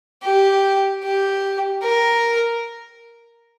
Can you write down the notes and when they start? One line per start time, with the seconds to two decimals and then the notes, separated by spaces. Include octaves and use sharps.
0.23 G4
1.04 G4
1.83 A#4